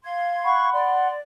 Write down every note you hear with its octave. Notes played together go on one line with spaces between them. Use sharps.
F5 C6 G#6
F#5 B5 C#6
D5 C6